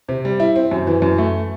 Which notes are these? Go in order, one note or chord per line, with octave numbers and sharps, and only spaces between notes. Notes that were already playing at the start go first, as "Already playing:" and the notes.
C3
G3
E4
C4
F#2
E3
F#2
A3